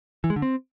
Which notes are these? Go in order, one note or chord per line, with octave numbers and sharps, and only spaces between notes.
E3
G#3
D3
C4